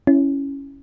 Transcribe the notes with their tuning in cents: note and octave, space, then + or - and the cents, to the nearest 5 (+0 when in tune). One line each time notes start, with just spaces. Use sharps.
C#4 +0 E4 +0